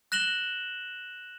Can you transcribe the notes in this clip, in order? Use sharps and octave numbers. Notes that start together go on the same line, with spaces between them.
F#6 A#6 E7 F#7 G7